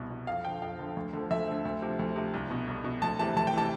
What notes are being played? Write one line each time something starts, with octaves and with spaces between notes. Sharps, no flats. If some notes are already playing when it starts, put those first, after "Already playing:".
Already playing: C2 B2
B2
F2 F5
D3 F3 G5
F2 F5
D3 F3
D2
D3 F3
D2 E5
D3 F3
D2
C3 F3
D2
C3 F3
C2
B2
C2
B2
D2 A5
C3 E3 A5
D2 A5
G5
C3 E3 A5